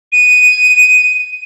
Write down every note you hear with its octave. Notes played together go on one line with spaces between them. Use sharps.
D#7